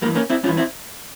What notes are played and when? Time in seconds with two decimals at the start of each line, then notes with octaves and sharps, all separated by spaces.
0.02 G2 G3 A#3
0.06 E3
0.15 A#3 C#4
0.30 C4 E4
0.43 G2 C#4 F4
0.48 E3
0.57 C4 E4